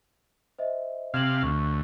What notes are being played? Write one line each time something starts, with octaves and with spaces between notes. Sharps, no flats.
C5 D#5 E5
C3 F5 G#6 E7 F#7
D2 C#6